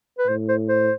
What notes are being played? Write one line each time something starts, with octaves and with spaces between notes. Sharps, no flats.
B4
A2 C5
C5
C5